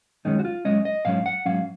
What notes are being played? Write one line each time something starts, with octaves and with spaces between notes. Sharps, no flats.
F#2 D#3 G#3 C#4 D#4
F#4
F4
F#2 D#3 G#3 C#4 D#5
D#5
G#2 F#3 C#4 F5
F#5
G#2 F#3 C#4 F5